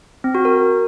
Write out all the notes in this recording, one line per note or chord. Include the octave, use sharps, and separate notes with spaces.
C4
F#4
A#4